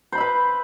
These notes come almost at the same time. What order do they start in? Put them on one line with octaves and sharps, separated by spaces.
C5 B5 E5 B4